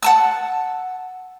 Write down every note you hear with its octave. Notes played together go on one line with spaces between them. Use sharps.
F#5 A5 E6